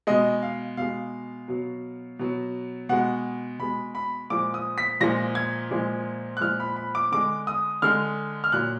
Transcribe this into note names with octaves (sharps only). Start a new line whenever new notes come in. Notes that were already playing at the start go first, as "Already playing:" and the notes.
B2 G#3 D#5
F5
B2 G#3 F5
B2 F#3
B2 F#3
B2 G#3 F#5
B2 G#3 B5
B5
A#2 F3 G#3 D6
D#6
B6
A#2 F3 G#3 A#6
G#6
A#2 F3 G#3
F#6
A#2 F3 G#3 F6
B5
B5
D6
D3 G#3 D6
D#6
D3 G#3 F6
F6
A#2 F#3 F#6